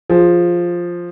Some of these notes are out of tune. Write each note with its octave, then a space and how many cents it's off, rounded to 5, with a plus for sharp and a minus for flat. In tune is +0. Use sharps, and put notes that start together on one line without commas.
F3 +0 G#4 +0